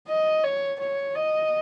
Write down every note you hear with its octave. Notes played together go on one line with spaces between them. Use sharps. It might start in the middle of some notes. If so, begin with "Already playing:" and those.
D#5
C#5
C#5
D#5